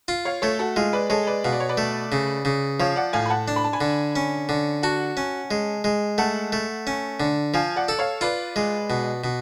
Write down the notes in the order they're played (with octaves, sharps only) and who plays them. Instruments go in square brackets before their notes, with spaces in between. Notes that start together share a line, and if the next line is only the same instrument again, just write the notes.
[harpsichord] F4
[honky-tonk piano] C#5 F5
[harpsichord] A3 [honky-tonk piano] A4 C#5
[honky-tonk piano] F#4 A4
[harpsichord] G#3 [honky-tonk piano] F4
[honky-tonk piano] B4 D5
[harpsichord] G#3 [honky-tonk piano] A4 C#5
[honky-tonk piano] B4 D5
[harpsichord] B2 [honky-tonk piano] F5
[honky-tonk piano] D5
C#5
B4 D5
[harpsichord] A3
C#3
C#3
[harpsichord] F3 [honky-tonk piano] C#5 F5
[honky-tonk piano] D5 F#5
[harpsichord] A2 [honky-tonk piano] F5 G#5
[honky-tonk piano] B5
F#5 A5
[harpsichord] D4
[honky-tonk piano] B5
A5
G#5 B5
[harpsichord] D3
C#4
D3
[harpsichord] F#4 [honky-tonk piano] F#5 A5
[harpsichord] C#4
G#3
G#3
[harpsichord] A3 [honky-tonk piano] F#5 A5
[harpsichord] A3
C#4
D3
[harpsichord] F3 [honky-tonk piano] F5 G#5
[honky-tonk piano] D5 F#5
[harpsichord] A4
[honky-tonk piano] C#5 F5
[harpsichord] F4 [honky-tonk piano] B4 D5
[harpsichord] G#3
B2
B2